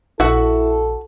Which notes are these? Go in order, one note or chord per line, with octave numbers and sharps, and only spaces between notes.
A#1 E4 F#4 A4 E5 F#5